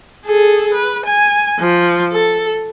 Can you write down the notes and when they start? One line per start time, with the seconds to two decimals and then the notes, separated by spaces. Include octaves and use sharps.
0.25 G#4 A4
0.73 B4
1.05 G#5
1.59 F3
2.12 A4